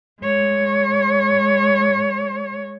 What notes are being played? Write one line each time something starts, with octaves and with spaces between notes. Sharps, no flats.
G#3 C#5